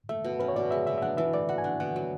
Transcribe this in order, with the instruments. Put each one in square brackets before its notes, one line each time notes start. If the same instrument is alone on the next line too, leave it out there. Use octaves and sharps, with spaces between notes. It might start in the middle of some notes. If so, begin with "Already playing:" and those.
[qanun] A3 [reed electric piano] E5
[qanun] B2
[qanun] C#4 [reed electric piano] B4
[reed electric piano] C#5
[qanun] B2 [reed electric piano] D5
[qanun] G#3 [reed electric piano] E5
[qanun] B2 [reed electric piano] E5
[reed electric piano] E5
[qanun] D4 [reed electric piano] F#5
[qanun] E3 [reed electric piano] E5
[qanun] A3 [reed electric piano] D5
[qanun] F#4 [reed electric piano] F#5
[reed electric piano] G#5
[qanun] D4 [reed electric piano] F#5
[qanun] B2 [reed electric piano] F#5
[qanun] F#3